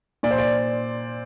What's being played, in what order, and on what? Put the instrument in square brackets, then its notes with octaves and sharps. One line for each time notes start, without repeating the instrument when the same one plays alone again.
[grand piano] A#2 D5
C5
D5